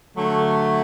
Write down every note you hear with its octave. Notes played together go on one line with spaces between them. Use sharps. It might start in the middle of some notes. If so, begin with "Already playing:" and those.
D3 F#3 A3